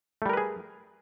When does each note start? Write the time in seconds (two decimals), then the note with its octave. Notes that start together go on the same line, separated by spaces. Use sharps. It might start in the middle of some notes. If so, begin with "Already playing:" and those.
0.22 A3
0.26 G3
0.29 A#4
0.33 B4
0.37 G#4